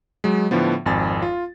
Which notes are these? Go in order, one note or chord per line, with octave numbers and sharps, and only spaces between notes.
F#3 G#3
A2 D3 F3 B3
G#1 F2 G#5 A6
F4